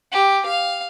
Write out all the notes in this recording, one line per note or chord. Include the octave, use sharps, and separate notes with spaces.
G4
F5